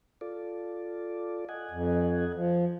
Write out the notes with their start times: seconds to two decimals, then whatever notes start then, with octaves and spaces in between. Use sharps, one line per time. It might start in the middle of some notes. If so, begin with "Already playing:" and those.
0.21 F4 A4 D5
1.49 D#5 F#5 G#5
1.71 F2
2.34 F3